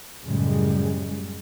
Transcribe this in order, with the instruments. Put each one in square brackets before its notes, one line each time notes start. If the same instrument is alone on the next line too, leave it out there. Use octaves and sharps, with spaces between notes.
[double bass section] F#2 A2 C#3 G3 G#3